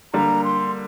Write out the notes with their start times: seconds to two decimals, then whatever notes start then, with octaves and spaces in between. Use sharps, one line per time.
0.14 D3 G3 A#3 A#5
0.45 C6